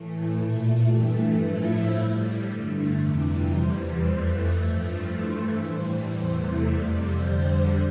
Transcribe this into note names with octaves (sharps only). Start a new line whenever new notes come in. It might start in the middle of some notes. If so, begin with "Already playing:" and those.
Already playing: A2 E3 A3
A#2 A3
G2 E3 A3 G4
A2 F3 A3 E4
A2 G3
G2 D3 A3
F2 C3 E3 G3
E2 E3 G3 C5
F2 E3 A3 C5
G2 F3 A3
G2 E3 A3 C5
A2 E3 G3 C5
E2 C3 E3 A3 C5
F2 C3 G3 D5
F2 D3 G3 C5